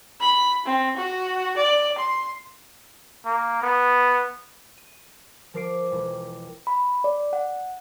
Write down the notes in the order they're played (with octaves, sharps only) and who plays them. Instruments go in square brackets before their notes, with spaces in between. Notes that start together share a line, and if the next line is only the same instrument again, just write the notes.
[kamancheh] B5
C4
F#4
D5
C6
[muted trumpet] A#3
B3
[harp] D#7
F3 A#4 D6 C7 D7
E1
[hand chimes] B5
D5
F#5